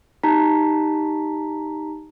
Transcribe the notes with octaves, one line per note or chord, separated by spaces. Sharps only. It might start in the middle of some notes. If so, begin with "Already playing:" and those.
D#4 G4 A5 A#5 B6